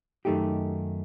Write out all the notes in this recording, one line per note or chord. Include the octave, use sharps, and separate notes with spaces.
F#2 D#3 A3 D#4 G4